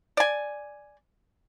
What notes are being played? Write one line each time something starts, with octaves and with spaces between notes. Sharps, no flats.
D5 G#5